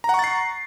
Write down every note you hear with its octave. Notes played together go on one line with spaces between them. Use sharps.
F#5 A#5 C#6 A6 C7